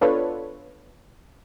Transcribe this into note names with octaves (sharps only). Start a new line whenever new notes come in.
B3 D4 F4 A4 B4 C#5